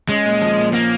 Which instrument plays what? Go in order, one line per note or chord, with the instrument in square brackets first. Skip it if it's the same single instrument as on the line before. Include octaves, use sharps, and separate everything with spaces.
[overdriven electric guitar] G#3 [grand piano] C#4
[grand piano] A#2
F3
A#2
[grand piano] F3 [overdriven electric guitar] A#3